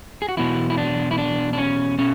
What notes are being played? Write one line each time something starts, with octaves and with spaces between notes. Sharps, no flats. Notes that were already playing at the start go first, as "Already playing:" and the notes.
G#4
F#4
E2 B2 F#3 E4
E4
D4
E4
D4
D4
C#4
B2 C#4